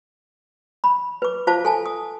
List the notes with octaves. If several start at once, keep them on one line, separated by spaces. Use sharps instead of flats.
B5
B4 D6
F4 C5 F5 A5 D6
A4 G#5 A5
D#6